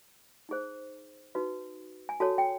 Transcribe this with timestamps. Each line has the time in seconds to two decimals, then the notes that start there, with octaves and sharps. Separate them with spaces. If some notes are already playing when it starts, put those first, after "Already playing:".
0.49 D#4 G#4 C5
1.35 D#4 F#4 B4
2.09 G#5
2.20 F#4 A4 C#5 A5
2.38 G5